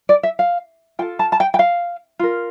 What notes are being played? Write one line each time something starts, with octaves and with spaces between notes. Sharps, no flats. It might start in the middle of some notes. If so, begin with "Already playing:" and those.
D5
E5
F5
F4 A4 G5
A5
A5
G5
G5
F5
F4 A#4